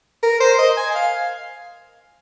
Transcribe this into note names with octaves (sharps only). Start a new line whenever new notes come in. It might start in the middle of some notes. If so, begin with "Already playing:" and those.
A#4
C5
D#5
G#5
F5